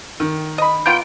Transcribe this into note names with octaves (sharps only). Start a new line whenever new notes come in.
D#3
D#5 B5
A#3 B3 F4 G5